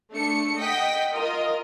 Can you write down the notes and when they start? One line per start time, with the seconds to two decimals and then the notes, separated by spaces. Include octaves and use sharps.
0.12 A3 D4 C#7
0.58 D#5 F#5 G5 B6
1.12 F4 A#4 D#5